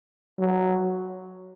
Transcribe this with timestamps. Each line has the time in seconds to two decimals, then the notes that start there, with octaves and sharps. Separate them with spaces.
0.39 F#3